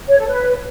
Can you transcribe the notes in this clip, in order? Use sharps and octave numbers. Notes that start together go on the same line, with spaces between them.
C#5
A4
B4